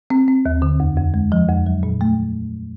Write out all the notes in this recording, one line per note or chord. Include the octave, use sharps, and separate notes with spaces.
C4
C4
D#2
D3
F2
F2
G#3
F3
F2
F#3
A#2
A3